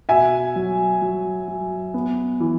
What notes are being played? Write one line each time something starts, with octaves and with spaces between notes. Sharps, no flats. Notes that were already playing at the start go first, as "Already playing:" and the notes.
B2 E5 G#5
F#3
F#3
F#3
B3
E3